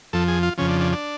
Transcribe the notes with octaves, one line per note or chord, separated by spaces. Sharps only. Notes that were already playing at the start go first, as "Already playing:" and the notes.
F2 F3 A4
G#4
F4
F2 C#3 F3 C#4
D4
D4
D4